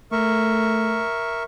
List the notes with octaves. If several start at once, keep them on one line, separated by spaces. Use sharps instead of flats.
A3 A#4 E5 C#6